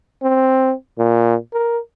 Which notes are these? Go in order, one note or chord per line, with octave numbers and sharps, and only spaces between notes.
C4
A#2
A#4